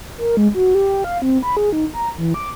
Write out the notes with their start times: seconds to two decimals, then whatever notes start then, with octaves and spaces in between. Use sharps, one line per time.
0.18 A#4
0.37 G#3
0.55 F#4
0.75 G4
1.04 F5
1.22 C4
1.43 B5
1.57 G#4
1.73 D#4
1.94 A#5
2.18 E3
2.34 D6